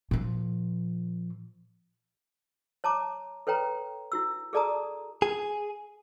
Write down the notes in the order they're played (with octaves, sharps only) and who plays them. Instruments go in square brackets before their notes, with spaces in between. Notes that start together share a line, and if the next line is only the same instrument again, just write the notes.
[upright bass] A#2 F3
[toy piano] C#5 A5 A#5 D6
A4 B4 C#5 G5 A#5
E4 F#4 E6
G#4 A4 D5 A5 A#5 D#6
[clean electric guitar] G#4